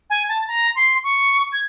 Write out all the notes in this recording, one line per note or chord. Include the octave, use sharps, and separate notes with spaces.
G#5
A5
A#5
C6
C#6
G#6